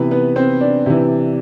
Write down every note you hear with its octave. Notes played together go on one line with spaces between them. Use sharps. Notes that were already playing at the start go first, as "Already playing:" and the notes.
Already playing: C3 E3 B3 B4
B3 B4
C4 C5
D4 D5
C3 E3